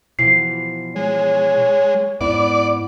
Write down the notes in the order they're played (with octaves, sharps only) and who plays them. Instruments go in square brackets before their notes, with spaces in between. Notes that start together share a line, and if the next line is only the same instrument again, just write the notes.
[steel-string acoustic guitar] B2 E3 F3 [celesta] C7
[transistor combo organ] G#3 [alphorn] C#5
[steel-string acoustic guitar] G#2 B3 E4 [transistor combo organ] D5